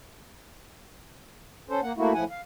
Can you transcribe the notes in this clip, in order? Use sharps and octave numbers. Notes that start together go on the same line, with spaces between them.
C#4 A4 C5
A#3 F#5
A3 A#3 E4 F#4
A2 F3 E4 F#5 G#5
F5